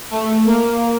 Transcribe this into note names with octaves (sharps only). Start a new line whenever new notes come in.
A3
A#3